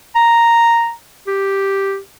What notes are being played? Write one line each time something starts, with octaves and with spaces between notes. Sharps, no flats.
A#5
G4